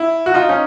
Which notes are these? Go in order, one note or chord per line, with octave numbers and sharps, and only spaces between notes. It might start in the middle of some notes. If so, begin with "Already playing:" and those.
Already playing: E4
F#4
D#4 F4
C#4 D#4